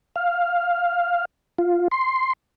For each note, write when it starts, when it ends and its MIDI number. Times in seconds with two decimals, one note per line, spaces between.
0.16 1.25 77
1.58 1.88 65
1.91 2.33 84